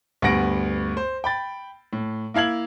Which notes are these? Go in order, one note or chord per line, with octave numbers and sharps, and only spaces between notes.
D2 G2 B3 F#5 A#6 D7
C5
G5 B5 A6
A2
A#3 E4 F5 G#6 F#7